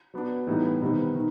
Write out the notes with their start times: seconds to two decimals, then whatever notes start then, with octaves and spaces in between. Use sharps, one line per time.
0.14 F#3 B3 D4
0.47 A2 E3 G3 B3 D#4
0.81 C3 D#3 G3 B3 D#4
1.15 D#3